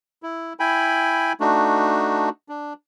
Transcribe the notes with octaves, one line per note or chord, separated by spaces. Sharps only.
E4
E4 G5 G#5 B5
A3 D4 D#4 F#4
D4